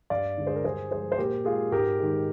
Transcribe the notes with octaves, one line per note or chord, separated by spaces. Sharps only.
G2 D5 F5
D3 G#3
G#4 C5
A#4
G2 G#4 C5
F3 G#3 G#4 C5
C5
A#2 G4 A#4
G#3 F4 G#4
G#2 G4 A#4
D#3 G#3